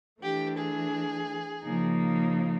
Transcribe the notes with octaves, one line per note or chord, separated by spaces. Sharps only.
E3 A3 D4 G4
G#4
C#3 F3 A#3 D#4